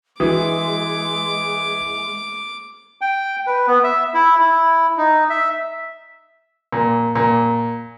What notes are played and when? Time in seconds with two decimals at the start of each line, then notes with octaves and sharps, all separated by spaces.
0.20 E3 G#3 F#4 D6
3.01 G5
3.47 B4
3.67 B3
3.84 E5
4.14 E4
4.40 E4
4.97 D#4
5.30 E5
6.72 A#2
7.15 A#2